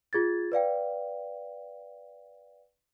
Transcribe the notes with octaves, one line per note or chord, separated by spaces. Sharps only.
F4 G#4 G#6 A6
B4 D5 F5 G5